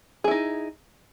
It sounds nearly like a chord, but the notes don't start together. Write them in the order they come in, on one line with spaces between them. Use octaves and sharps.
G#4 E4 D#4